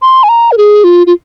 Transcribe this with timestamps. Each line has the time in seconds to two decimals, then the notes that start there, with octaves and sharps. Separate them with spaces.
0.02 C6
0.23 G#5
0.29 A#5
0.52 A#4
0.57 G#4
0.84 F4
1.07 F4